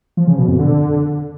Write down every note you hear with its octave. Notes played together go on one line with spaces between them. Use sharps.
F3
C#3
B2
F2
D3